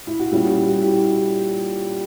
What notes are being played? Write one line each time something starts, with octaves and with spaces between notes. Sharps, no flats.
E4
F#4
A#2 G3 C#4 E4 G4
F#4
F#4
E4 G4